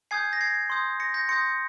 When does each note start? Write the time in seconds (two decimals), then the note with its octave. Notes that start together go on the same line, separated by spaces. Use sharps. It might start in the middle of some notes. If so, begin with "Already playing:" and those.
0.11 G#5 D#6 G6 G#6 C7
0.33 A#6
0.41 G#6 C7
0.70 C6 D#6 G6
1.00 A#6 C#7
1.14 G6 A#6
1.29 C6 D#6 G6 A#6 C#7